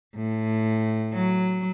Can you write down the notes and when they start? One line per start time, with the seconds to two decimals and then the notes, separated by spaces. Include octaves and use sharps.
0.15 A2
1.14 F#3